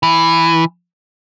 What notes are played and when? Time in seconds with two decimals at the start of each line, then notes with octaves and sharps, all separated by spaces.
0.03 E3